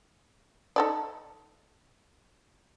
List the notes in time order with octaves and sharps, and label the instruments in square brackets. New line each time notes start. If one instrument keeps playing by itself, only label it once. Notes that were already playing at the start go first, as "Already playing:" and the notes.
[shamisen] D#4 A4 D5